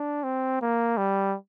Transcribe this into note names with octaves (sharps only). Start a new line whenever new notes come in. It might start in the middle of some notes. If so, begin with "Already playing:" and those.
Already playing: D4
C4
A#3
G3